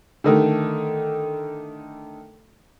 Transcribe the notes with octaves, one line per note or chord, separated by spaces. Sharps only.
D3 D#3 A3